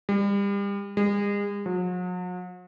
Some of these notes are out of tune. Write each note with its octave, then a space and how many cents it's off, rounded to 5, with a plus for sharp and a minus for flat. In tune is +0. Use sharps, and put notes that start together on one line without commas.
G3 +35
G#3 -40
F#3 -45